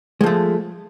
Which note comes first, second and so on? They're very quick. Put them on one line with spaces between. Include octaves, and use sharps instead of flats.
G#3 F3 A3